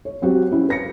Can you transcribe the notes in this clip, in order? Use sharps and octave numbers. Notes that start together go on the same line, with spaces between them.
C#5
F#3 C4 F#4 G4
C#4 E4
B4 A#6 C#7